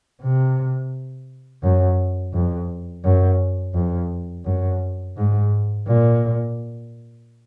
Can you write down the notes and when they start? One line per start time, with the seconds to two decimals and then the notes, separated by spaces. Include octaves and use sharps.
0.22 C3
1.63 F#2
2.33 F2
3.04 F#2
3.74 F2
4.45 F#2
5.16 G#2
5.87 A#2